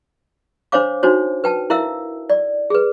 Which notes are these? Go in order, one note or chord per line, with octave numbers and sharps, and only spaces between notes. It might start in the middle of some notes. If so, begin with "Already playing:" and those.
D4 C5 C#5 F5 D6
D4 D#4 F#4 C5 C#5
B4 G5 A5
E4 A#4 E5 F5 E6
D5
G#4 B4